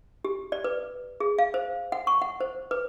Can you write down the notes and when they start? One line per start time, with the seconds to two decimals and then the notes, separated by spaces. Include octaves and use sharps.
0.25 G4
0.52 D5
0.64 B4
1.20 G#4
1.38 F5
1.54 C5
1.92 F#5
2.07 C#6
2.22 F#5
2.40 C5
2.71 B4